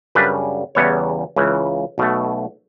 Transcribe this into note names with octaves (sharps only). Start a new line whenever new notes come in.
F#2 C#3 G3 D4 B4
E2 C#3 E3 G3 B3 C#5
C#2 C#3 E3
B1 B2 A3